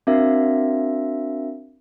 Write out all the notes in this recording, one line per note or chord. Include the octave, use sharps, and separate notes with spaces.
C4 D4 F#4 A#4 E5 F5